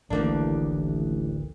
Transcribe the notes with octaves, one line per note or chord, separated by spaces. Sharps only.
D1 A1 D2 B2 D#3 A#3 D4